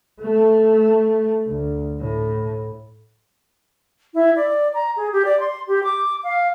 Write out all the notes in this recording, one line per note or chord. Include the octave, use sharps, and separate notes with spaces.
A3
D2
A2
E4
D5
A#5
G#4
G4
D5
C6
G4
D6
F5